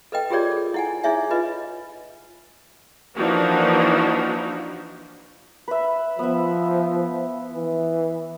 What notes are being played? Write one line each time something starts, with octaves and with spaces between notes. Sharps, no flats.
A4 B4 D#5 G5
F4 G4 G#4 A#4 C#5 D5
A4
E4 F#5 G#5
D#4 E4 G#4 C#5 E5 G#5
F4 B4 D#5
E3 F3 A#3 D4 D#4 F#4
B4 E5
F3 B3 E5
E3